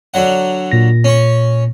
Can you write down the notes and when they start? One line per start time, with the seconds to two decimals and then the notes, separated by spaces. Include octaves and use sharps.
0.14 D3 F#3 F#5
0.72 A#2 A#6
1.04 C#4 C#6